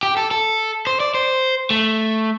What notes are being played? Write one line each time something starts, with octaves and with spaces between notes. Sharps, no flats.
G4
A4
A4
C5
D5
C5
A3